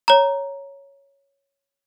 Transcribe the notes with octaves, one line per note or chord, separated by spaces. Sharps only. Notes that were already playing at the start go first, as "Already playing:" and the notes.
C#5 A#5